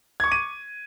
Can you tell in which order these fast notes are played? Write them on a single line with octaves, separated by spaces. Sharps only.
G#6 C#6 D6 D#7